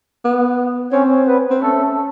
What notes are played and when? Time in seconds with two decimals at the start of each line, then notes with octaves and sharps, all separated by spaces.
0.25 B3
0.92 C4 C#4 C#5
1.27 B3 B4
1.50 C4
1.61 A3 C#4 A4